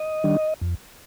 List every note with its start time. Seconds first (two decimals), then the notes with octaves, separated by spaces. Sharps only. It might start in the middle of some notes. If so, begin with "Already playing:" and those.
Already playing: D#5
0.24 D#3 G3 D4
0.61 F2